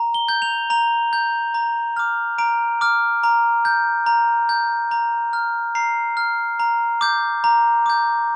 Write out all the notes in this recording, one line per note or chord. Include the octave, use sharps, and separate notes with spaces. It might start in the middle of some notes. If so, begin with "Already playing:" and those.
Already playing: A#5
G7
G6
F7
A#5 F7
G6
A#5
D6 F6
A#5 D7
D6 F6
A#5
G6
A#5
G6
A#5
F6
A#5 C7
F6
A#5
D6 G6
A#5
D6 G6